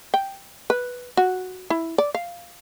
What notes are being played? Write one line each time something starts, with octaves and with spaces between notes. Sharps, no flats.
G5
B4
F#4
E4
D5
F5